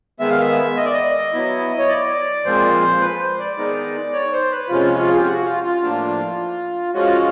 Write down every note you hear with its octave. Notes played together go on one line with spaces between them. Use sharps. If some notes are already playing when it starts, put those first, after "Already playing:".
D#3 G#3 B3 E5
F5
E5
D#5
D5
D#5
F#3 B3 E4
C#5
D5
A#2 F3 G#3 C4 C5
B4
C5
D5
D#3 G#3 B3 D#4
C#5
C5
B4
C3 F3 G#3 C#4 F4
F4
G#4
G4
F#4
F4
F4
A2 F3 A#3 D4
F3 G#3 C#4 F4 F#4